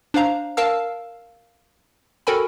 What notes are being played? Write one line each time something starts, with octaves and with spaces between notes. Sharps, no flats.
D4 C5 F5 A#5
A#4 F5 A5 E6
F#4 A4 A#4 G5 G#5 B5